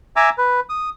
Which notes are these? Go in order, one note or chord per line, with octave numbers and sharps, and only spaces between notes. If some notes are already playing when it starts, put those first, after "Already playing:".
E5 G#5 A#5 D6 E6
B4
D#6